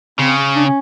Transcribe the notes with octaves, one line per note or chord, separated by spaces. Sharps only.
C#3 C4
D4
C#4